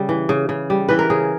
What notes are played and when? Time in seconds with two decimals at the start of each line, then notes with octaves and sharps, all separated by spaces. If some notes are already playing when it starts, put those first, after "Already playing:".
Already playing: C#3 G3
0.09 E3
0.29 C#3
0.49 C#3
0.70 G3
0.89 E3 B4
0.99 A#4
1.10 C#3 G#4